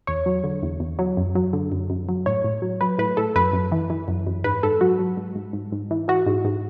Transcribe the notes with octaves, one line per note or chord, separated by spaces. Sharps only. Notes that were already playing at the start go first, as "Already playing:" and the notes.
E2 C#5
F#3
D3
E2
E2
F#3
F#2
F#3
D3
F#2
F#2
F#3
A2 C#5
A2
F#3
F#3 B4
A2 B4
A2 A4
F#2 B4
F#2
E3
E3
F#2
F#2
G#2 B4
G#2 A4
F#3 F#4
F#3
G#2
G#2
G#2
G#2
E3
E3 F#4
G#2
G#2